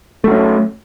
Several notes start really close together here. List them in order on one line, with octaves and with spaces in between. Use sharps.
A3 F#3 C#4